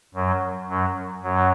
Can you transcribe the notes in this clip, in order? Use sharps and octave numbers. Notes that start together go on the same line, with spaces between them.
F#2 F#3
F#2 F#3
F#2 F#3